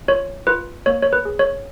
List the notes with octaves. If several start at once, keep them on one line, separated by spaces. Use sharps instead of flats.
F4 C#5
F4 B4
A#3 C#5
C#5
B4
G#4
C#5